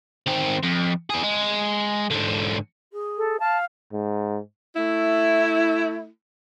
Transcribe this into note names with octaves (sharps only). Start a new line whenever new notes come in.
D#3 C4
F2
B3 G#4
G#3
G#2 D3
G#4
A4
F5 A5
G#2
A3 E4